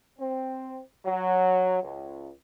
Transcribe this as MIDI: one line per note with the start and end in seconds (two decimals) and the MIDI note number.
0.19 0.78 60
1.06 1.78 54
1.83 2.29 37